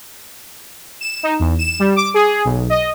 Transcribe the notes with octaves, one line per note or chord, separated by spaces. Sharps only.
E7
D#4
E2
E7
G3
D6
G#4
B1
D#5